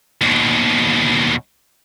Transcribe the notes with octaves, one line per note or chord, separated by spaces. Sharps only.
D#2 B2